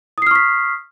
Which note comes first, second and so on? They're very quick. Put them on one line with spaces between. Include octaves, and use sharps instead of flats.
D#6 C7 F6 C#6 B6